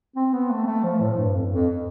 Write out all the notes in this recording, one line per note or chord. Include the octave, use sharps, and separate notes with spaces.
C4
B3
A3
A3
F3
A2
G2
F2
G2
F2